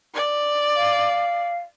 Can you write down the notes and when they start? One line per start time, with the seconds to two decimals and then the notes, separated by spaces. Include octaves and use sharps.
0.15 D5
0.76 F5